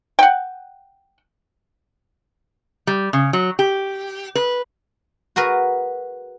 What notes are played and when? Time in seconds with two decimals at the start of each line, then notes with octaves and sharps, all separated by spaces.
0.19 F#5 G5
2.87 G3
3.13 C#3
3.33 F#3
3.59 G4
4.35 B4
5.36 F#4 G#4 A#4 B4